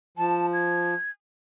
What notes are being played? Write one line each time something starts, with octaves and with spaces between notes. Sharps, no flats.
F3 A5
G#6